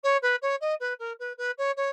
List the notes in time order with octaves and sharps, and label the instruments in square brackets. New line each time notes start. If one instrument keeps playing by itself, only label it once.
[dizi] C#5
B4
C#5
D#5
B4
A#4
B4
B4
C#5
C#5